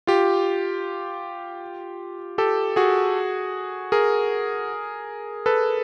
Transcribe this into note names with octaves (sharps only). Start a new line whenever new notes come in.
F4 G4
G4 A4
F#4 G#4
G#4 A#4
A4 B4